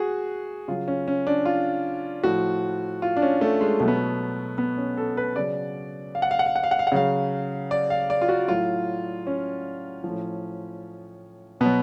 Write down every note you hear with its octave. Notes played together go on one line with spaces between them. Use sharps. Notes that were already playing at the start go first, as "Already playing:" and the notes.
Already playing: F#4 G#4
C#3 F#3 F4
C#4
C#4
D4
F4
A2 F3 F#4
F4
D4
C#4
A3
G#3
B2 F#3 A3
B3
A3
B3
C#4
A4
B4
C#3 F#3 D5
F5
F#5
F5
F#5
F5
F#5
F5
F#5
F5
F#5
C#3 F#3 F5
D5
F5
D5
F4
F#4
A2 F#3 F4
C#4
A2 F3
B2 F#3 B3